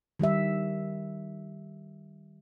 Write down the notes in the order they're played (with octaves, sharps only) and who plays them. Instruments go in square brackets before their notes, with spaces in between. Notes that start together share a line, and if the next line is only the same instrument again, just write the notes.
[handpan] D#3 G3 G4 E5